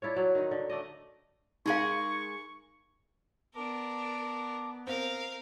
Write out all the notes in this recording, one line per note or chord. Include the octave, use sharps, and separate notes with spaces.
D4 E4 F4 C#5
F#3
D#3 D#4
D3
A3 D5 D#5
G#3 D#4 G#4 A#4 F5 C#6
B3 D4 A#4 A5 D6
C4 A#4 F5